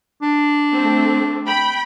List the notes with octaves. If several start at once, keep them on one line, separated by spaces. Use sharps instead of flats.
D4
A3 C4
G5 B5